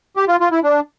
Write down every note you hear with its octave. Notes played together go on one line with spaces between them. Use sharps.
G4
F4
F4
E4
D4